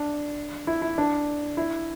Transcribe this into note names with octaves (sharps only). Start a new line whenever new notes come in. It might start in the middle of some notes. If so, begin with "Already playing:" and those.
Already playing: D4
E4
E4
D4
E4